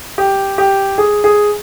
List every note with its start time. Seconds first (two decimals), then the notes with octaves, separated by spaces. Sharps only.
0.18 G4
0.58 G4
0.98 G#4
1.24 G#4